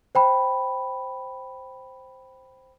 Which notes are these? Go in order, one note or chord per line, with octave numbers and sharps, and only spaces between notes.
C5 G5 B5